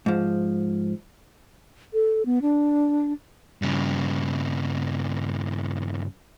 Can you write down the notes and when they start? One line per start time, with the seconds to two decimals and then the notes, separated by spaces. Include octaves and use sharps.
0.06 G#2 F3
1.94 A4
2.26 B3
2.42 D4
3.62 G2 C#3